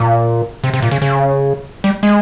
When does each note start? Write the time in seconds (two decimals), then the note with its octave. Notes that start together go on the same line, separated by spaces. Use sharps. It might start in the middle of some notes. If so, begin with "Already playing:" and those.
Already playing: A#2
0.64 C3
0.74 C3
0.82 A#2
0.91 C#3
1.02 C#3
1.84 G3
2.03 G#3